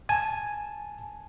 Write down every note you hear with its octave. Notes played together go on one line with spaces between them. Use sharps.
G#5 A5